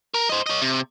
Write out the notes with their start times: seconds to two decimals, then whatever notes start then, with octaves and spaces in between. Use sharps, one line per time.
0.14 A#4
0.29 C5 D#5
0.46 C#5 D#5
0.62 C3